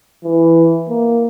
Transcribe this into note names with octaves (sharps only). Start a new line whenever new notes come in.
E3
A#3